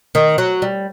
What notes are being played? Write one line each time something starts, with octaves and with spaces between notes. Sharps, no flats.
D#3
F#3
G3